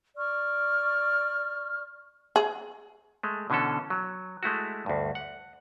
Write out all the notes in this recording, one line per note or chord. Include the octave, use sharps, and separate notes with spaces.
D5 C#6 F6
G#4
G#3 A3
B2 D3 E3 C#4 A4
F#3
G#3 A3 E4 F#4
D2 G2
F#5